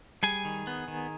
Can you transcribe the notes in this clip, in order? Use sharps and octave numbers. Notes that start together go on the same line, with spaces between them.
G3 G#4 G#5
D#3
B3
D#3